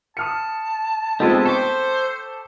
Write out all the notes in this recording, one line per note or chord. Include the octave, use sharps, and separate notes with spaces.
A5 D#6 F6 C#7
G#3 B3 C4 D#4 F4 G4 A4 D#5
A4 C5 G5 C#6 D6 B6